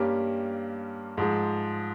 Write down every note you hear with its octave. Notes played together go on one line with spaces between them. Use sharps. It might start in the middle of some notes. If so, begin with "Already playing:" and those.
Already playing: G2 G3 A#3 C#4 G4
G#2 F3 G#3